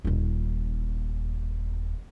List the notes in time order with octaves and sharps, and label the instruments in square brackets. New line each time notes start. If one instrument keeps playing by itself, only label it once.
[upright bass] D#1 D#4